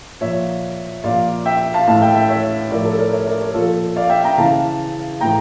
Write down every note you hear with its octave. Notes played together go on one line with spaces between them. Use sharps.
A#2 F3 C#5 E5
A#2 F3 D5 F5
E5 G5
F5 A5
A2 E3 F5 A5
E5 G5
E5 G5
C#5 E5
A2 F3 A#4 D5
A4 C#5
A#4 D5
C#5 E5
A#4 D5
A4 C#5
A#2 F3 F4 A4
D5 F5
E5 G5
G5 A#5
C#3 E3 F5 A5
A2 E3 G5 A#5